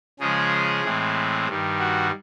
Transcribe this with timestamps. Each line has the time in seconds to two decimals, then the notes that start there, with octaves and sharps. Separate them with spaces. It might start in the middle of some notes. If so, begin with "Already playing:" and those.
0.20 C#3 F3 G#3 G#4
0.84 A2 E3 G#3 C4
1.48 G2 D#3 G3
1.79 F#4